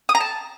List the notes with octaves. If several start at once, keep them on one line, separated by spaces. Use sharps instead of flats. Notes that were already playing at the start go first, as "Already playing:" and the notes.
D#6
A#5
A5